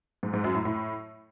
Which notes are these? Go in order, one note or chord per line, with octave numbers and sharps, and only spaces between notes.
G#2
G#2
F#2
A2
A2